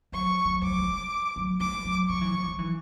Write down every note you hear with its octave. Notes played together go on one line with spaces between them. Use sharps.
F#3 C#6
F#3
F#3 D6
G3
F#3
G3 D6
F#3
F#3 C#6
E3
F#3
F#3
E3